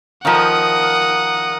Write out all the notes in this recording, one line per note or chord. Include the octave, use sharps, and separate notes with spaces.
D#3 F3 A#4 D#5 F5 F#5 D#6